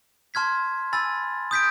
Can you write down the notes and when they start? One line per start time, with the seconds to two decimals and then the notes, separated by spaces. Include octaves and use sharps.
0.34 A5 C6 F6 G#6 B6
0.93 G#5 B5 E6 A6
1.51 D#6 G6 B6 D7